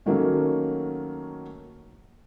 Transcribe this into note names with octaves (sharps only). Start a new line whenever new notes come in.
D#3 F#3 A3 A#3 C#4